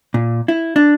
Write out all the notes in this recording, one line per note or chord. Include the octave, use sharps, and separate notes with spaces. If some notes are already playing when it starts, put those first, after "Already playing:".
A#2
E4
D4